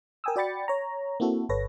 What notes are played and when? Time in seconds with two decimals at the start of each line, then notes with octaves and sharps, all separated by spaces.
0.24 A#4 G5 G#5 D#6 E6
0.36 F#4 D5 G5 B5 A6 C#7
0.68 C#5 A#5
1.20 A#3 C4 E4 F#4 A4
1.49 G1 A4 B4 C#5 A#6